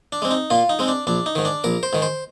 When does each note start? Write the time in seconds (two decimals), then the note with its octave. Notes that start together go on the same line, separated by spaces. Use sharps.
0.12 D4
0.22 G#3 C4
0.31 D#4
0.50 A#2 F4
0.69 D#4
0.79 G#3 C4
0.88 D4
1.07 A#1 D4
1.26 D#4
1.35 G#2 D#3
1.45 D4
1.64 A#1 A#4
1.83 C5
1.93 G#2 D#3
2.02 C5